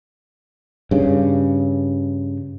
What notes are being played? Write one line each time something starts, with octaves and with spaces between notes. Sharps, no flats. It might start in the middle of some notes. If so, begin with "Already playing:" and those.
G2 C#3